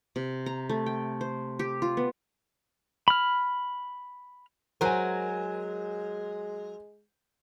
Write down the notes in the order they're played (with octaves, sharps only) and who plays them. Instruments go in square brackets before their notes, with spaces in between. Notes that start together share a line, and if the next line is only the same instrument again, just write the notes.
[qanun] C3
A#5
A3
G5
C5
G4
F4
B3
[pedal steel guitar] B5 F6
[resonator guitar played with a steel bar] F#3 A#4 [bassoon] G#3 [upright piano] C5 G#5